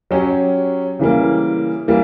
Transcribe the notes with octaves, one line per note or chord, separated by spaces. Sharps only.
F#3 C#4 G4
C#3 E3 G3 A#3
E3 G3 A#3